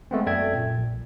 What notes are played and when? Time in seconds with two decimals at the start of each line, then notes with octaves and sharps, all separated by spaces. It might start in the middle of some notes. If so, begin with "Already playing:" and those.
0.11 G#3 A3 B3 C4
0.26 F#2 A4 D5 E5 G5 G#6
0.55 A#2
0.78 A#1